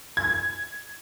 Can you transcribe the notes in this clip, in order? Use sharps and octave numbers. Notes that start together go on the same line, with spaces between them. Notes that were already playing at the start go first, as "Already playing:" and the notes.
G#6